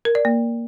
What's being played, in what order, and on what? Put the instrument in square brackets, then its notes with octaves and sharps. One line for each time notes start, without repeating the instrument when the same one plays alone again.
[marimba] A#4
D5
A#3